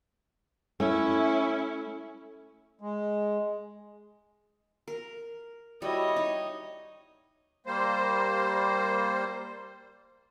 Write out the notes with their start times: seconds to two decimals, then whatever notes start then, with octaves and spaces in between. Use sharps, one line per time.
0.80 A3 C#4 E4
2.81 G#3
4.88 A#4
5.82 G3 E4 F#4 C#5 D#5
6.16 D#4
7.66 G3 A#3 C5